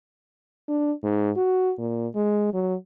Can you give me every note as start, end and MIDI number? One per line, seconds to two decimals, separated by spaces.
0.68 0.92 62
1.03 1.31 44
1.36 1.72 66
1.78 2.07 46
2.15 2.51 56
2.54 2.75 54